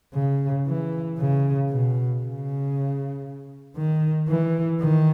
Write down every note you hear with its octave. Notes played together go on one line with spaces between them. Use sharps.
C#3
E3
C#3
B2
C#3
D#3
E3
D#3